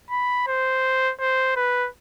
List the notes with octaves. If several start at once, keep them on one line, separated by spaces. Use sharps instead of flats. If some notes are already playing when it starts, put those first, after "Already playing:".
B5
C5
C5
B4